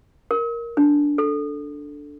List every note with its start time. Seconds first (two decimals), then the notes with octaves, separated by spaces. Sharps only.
0.31 A#4
0.77 D4
1.18 A4